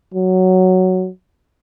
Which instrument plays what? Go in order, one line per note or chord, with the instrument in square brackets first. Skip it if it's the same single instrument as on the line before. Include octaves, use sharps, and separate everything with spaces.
[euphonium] F#3